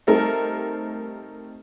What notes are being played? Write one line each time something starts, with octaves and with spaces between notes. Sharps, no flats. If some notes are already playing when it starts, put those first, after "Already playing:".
G3 A3 C4 D#4 A4 A#4